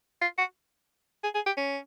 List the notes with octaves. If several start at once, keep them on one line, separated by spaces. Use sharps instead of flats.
F4
F#4
G#4
G#4
G4
C#4